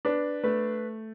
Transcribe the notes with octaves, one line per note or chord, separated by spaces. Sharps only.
D4 B4
A3 B4